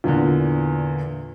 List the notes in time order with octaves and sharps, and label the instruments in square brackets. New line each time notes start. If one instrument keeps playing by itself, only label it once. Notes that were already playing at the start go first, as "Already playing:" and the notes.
[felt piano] E2 A#2 D3